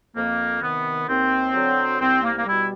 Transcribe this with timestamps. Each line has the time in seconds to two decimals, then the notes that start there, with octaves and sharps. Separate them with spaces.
0.15 F2 A#3
0.61 C3 D#3 B3
1.08 D#2 C4
1.53 D3 F#3
2.00 C2 C4
2.23 A#3
2.37 A#3
2.46 B2 G3 E4